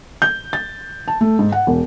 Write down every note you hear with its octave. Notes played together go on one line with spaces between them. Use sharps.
G6
A6
A5
A3
G#2
F#5
E1